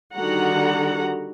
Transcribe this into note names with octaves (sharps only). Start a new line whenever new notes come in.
D3 D#3 G3 F#4 F#5 A#5